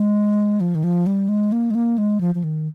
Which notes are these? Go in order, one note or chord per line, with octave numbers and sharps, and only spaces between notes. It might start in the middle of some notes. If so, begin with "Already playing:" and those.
Already playing: G#3
F3
D#3
F3
G3
G#3
A#3
G#3
A#3
G#3
F3
F3
D#3